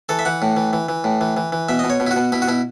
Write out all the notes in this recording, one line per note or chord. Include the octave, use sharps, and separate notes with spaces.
E3 A4
E5
E3 F#5
A2
E3
E3
E3
A2
E3
E3
E3
B2 E5
B2 D#5
C#5
B2
E4
F#4
B2
B2 E4
F#4
B2 E4